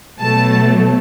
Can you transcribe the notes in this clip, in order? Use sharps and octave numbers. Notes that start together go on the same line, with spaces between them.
B2 F#3 A3 A5